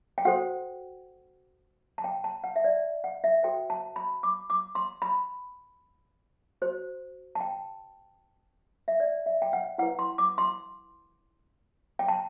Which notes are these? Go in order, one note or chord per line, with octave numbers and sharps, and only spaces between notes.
G5
F#4 A4 C5 F#5
A5
G5
A5
F#5
E5
D5
F#5
E5
F#4 A4 C5 G5
A5
B5
D6
D6
C6
B5
F#4 C5
A5
G5
E5
D5
E5
G5
F#5
E4 B4 F#5
C6
D6
C6
G5
A5